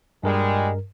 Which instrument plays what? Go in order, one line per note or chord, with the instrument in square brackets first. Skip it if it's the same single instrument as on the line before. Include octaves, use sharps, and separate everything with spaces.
[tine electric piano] G2 A#4 [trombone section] A#2 G3 G#3